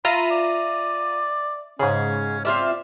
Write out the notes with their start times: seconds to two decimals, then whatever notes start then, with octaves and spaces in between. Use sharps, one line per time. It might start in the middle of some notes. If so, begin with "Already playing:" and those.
0.05 F4 E5 A#5 B5 D#7
0.31 D5
1.79 G#2 C#3 C#4 G#4
2.45 C4 F4 D5 E5